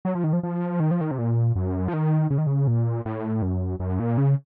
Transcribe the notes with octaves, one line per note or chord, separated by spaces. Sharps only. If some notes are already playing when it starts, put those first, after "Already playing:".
F#3
F3
D#3
F3
F3
D#3
F3
D#3
C3
A#2
F#2
F3
D#3
C#3
D#3
C#3
A#2
A2
F#2
F#2
A#2
C#3